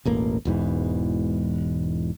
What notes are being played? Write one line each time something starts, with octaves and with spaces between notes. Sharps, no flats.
E1 A1 A#3
E1 E2 G#2 E3